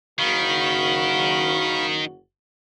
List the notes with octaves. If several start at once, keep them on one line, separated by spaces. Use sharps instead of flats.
F#1 D#3 F#4 F5 B5 C#6